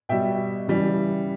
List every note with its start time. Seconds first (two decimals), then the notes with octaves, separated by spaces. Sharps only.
0.09 B2 G3 E5 G5
0.68 C#3 E3 G3